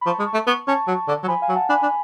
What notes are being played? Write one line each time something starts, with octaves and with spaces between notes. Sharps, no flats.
B5
F3 A5 C#6
G#3
A5 C#6
A3
B3 C#6
C#4 A5 C#6
F#3
D3
F#3
F3 G#5 B5
F5 G#5
F#3
F#5 A5
D4 G#5 B5
D4